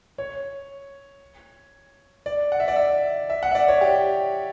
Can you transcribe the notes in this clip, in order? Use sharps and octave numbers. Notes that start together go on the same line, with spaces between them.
C#5
D5
F#5
E5
D5
E5
E5
F#5
E5
D5
C#5
G4